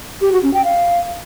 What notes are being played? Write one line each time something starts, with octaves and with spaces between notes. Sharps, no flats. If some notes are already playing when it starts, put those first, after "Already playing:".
G4
F#4
C#4
G5
F5